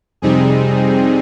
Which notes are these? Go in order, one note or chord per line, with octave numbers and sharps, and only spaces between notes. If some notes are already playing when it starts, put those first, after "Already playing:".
F2 C3 G3 C4 D#4 G#4